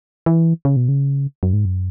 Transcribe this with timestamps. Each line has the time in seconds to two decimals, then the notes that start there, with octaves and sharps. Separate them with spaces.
0.26 E3
0.65 C#3
0.76 B2
0.89 C#3
1.43 F#2
1.53 G#2
1.65 F#2